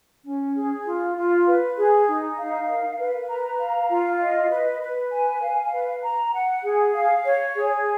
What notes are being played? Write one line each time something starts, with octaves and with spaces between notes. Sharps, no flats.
C#4
G#4
F4
F4
B4
G#4
D#4
F5
A#4
B4
A#5
F5
F4
D#5
B4
B4
G#5
F5
B4
A#5
F#5
G#4
F5
C#5
G#4